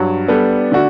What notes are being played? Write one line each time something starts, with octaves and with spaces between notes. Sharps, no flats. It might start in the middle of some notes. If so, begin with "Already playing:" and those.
Already playing: G2 F#3 F#4
G3 B3 D4 A4
D3 A3 D4 F#4